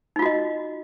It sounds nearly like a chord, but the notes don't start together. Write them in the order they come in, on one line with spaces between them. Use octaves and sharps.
D#4 F4 F#4 D#5